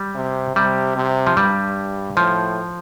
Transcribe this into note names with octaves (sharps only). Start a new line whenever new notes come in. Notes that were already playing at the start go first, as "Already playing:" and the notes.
Already playing: G3
C3
C3 G3
C3
F3
G2 G3
A2 F3